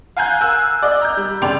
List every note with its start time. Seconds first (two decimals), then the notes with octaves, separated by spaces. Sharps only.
0.17 F5 F#5 G#5 A#5 F#6 G6
0.41 A#4 G#5 E6 F#6
0.83 D5 D#5
1.02 A#5 G6
1.17 G3
1.42 F1 C#3 D5 G5 C6 F7